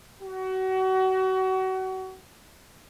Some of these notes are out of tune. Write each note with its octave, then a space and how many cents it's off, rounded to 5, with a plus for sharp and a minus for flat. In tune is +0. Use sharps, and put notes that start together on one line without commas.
F#4 +30